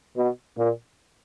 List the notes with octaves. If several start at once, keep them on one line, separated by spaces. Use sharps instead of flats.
B2
A#2